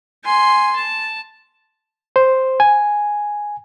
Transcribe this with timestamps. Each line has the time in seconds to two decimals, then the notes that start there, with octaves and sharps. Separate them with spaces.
0.25 G#5 C6
0.76 A5
2.16 C5
2.60 G#5